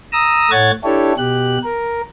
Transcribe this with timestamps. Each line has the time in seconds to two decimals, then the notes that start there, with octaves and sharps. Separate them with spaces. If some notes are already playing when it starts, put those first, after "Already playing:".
0.13 A#5 D#6 E6
0.51 A2 A3 C#5 F#5 G#6 A6
0.84 D4 E4 G4 A4 C#5
1.17 B2 G4 F#6
1.64 A#4